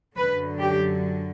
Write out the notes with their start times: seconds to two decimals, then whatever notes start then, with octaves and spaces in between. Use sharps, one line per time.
0.17 F#2 D3 F#3 B4
0.61 G4